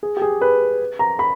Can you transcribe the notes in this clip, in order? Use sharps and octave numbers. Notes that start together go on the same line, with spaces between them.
G#4
G4
G#4
B4
A#5
B5